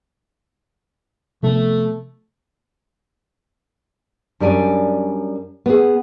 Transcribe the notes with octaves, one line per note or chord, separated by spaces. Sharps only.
C3 F3 A3 B3
F#2 G3 D4 D5 G#5
B3 G#4